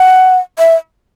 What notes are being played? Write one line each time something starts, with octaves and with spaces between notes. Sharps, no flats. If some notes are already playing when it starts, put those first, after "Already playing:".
Already playing: F#5
E5